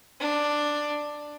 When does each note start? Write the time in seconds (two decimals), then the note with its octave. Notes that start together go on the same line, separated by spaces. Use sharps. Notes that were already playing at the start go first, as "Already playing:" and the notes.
0.20 D4